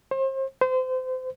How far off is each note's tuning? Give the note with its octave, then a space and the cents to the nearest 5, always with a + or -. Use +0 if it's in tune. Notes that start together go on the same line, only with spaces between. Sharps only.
C5 +35
C5 -30